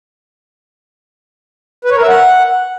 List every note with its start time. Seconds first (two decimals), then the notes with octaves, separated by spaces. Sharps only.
1.85 B4
1.91 C#5
1.97 A#4
2.03 E5
2.08 F#5